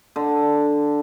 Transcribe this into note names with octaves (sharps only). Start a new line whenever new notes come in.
D3